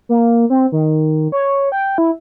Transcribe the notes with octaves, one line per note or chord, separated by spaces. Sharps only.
A#3
C4
D#3
C#5
G5
E4